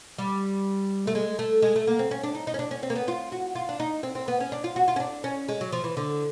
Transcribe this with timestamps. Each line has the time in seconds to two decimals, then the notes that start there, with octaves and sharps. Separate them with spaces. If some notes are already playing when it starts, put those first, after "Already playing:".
0.18 G3
1.07 A3
1.15 G#3
1.39 A3
1.62 G#3
1.76 A3
1.87 A#3
1.99 C4
2.11 C#4
2.23 D4
2.35 D#4
2.47 D#4
2.54 C#4
2.59 D4
2.71 C#4
2.83 C4
2.90 A#3
2.95 B3
3.08 F4
3.32 F#4
3.55 F4
3.69 D4
3.80 D#4
4.03 C4
4.15 C4
4.28 B3
4.40 C#4
4.52 D4
4.64 F4
4.76 F#4
4.88 F4
4.96 C#4
5.00 D4
5.24 C#4
5.49 G#3
5.61 F#3
5.73 F3
5.84 E3
5.97 D3